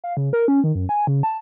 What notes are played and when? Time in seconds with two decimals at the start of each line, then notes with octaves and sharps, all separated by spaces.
0.04 F5
0.17 C#3
0.33 A#4
0.48 C#4
0.64 D#3
0.75 F#2
0.89 G#5
1.07 C#3
1.23 A5